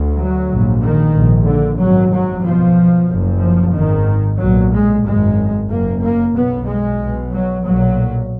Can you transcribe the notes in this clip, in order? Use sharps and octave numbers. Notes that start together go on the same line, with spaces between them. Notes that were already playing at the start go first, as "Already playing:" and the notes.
Already playing: D2
F#3
A#1 G#2
D#3
A#1 G#2
D3
G#1 F#2 F#3
F#3
B1 B2 F3
F#1 F#2
F3
G#1 G#2 D#3
B1 A#2 F#3
G#3
G#1 F#2 G#3
F#1 F#2 A#3
A#3
B1 B2 B3
G#3
B1 B2
F#3
B1 A#2 F#3